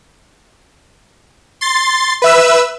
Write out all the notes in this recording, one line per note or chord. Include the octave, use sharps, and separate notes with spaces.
C6 A6
B4 E5 E6